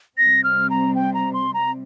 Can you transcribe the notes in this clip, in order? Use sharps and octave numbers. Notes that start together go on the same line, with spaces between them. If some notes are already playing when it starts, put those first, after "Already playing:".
C3 G3 C4 A#6
F6
A#5
G5
A#5
C6
A#5